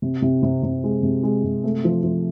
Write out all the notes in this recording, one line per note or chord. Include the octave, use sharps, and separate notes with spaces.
C3
C3
C3
C3
G#3
C3
G#3
C3
A3
F3
F3